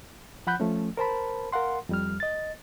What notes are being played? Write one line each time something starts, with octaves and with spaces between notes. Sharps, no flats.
F3 F#5 B5 F#6 G6
F3 A3 C#4
A#4 C5 A5 B5
A#4 F5 F#5 C6
F2 G3 F6
D#5 A6